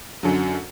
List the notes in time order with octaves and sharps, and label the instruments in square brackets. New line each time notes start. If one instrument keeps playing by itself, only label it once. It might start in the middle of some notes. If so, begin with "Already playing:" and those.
[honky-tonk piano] F#2 D3 F#3